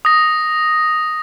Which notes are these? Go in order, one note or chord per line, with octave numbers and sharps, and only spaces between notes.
D#6 A#6